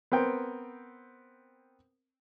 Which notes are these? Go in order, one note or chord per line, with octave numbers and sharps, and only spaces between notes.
B3 C4 A#4 G5